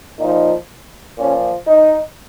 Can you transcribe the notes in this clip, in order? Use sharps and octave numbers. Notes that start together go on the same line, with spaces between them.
A#2 F3 D#4
A#2 F3 C#4
D#4